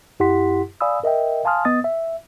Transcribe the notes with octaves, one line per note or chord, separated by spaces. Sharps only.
F#2 E4 G4 F#5 C6 B6
D5 F5 G#5 B5 D#6 E6
A#4 D#5 E5 G5
F5 G#5 A5 C6 D#6 F6
B3 D#5 D#6 A6
E5